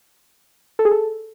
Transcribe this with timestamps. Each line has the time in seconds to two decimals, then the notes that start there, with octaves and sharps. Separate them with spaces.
0.79 A4
0.85 G#4
0.91 A4